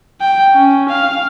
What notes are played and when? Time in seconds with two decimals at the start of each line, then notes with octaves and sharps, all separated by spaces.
0.21 G5
0.54 C#4
0.89 F5